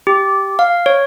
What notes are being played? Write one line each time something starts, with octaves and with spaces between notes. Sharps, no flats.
G4
F5
C#5